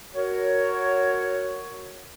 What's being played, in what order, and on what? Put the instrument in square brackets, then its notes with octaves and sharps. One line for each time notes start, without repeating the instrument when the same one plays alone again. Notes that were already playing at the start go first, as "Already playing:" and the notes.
[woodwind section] F#4 A#4 C#5